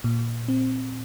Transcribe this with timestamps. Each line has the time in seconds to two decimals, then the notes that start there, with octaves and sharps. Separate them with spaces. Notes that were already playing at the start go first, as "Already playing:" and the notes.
0.04 A#2
0.48 C4